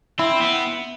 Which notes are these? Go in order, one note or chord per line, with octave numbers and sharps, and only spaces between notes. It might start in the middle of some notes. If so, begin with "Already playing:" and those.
C4 E4
B3